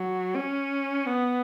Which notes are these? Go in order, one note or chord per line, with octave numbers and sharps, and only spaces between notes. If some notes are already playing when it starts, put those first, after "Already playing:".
Already playing: F#3
C#4
B3